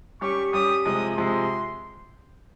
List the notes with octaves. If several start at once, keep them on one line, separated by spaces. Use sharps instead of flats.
G3 C#4 G4 C#6
G3 C#4 G4 D#6
C3 F3 G#3 D#6
C3 F3 G#3 C6